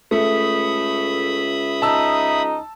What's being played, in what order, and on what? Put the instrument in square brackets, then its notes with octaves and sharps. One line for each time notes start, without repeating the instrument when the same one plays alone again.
[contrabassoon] C#2 [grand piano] A3 [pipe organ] E5 B5 D#6
[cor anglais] D#4 [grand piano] A5 E6